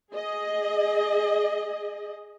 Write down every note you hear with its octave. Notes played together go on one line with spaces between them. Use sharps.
G#4 D#5